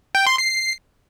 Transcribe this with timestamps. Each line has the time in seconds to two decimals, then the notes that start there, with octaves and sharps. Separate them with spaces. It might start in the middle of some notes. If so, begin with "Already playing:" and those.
0.15 G5
0.26 C6
0.38 C7